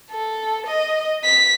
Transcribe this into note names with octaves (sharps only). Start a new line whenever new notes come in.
A4
D#5
B6